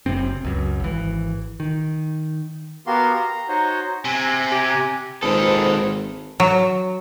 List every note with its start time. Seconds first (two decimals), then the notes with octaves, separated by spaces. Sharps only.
0.06 F#1 F#2 C3 C4
0.44 C#2 F#2
0.80 G#1 E3
1.60 D#3
2.87 B3 F#4 G4 A#4 F5 C6
3.15 A#5
3.49 D#4 F#4 C5 C#5 D#5
4.05 C3 G#5
4.51 G4 G#5
5.23 G#1 A#2 D#3 G#4 A4 B4 C5 A5
6.40 F#3